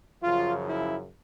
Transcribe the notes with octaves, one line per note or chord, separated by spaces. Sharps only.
F#2 C#3 F3 F4
E4